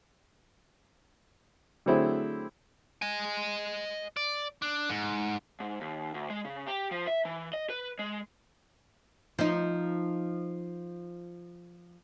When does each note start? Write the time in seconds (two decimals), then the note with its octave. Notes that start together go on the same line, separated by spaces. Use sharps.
1.86 D3 F#3 A3 C4 E4 G#4
3.02 D#5 G#5
4.17 D5
4.62 D4
4.90 G#2
5.60 G#2
5.81 D#2
6.14 D2
6.30 G#3
6.45 C#3
6.67 G4
6.91 F3
7.07 E5
7.25 E3
7.53 D#5
7.70 B4
7.99 G#3
9.39 F3 D#4